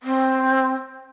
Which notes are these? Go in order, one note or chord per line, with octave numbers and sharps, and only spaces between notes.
C4